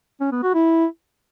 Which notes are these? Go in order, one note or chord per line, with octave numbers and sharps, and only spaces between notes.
C#4
B3
F#4
E4